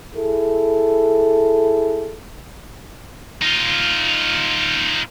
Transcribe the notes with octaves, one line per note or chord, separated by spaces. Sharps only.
E4 G#4 A4
D#4 F4